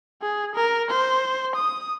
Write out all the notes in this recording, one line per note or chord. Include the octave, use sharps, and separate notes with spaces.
G#4
A#4
C5
D#6